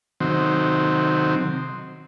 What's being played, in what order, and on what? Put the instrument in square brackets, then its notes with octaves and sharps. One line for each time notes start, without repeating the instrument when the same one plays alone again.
[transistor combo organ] C3 D#3 F#3 C4